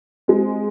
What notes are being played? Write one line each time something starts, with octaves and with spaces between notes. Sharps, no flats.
G#3 C4